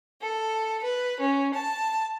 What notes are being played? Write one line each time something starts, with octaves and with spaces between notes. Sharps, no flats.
A4
B4
C#4
A5